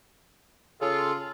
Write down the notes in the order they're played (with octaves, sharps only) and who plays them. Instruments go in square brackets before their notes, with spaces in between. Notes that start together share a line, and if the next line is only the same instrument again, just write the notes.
[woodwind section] C#3 F4 [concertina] G#4 A4